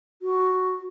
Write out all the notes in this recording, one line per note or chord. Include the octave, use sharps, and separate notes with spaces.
F#4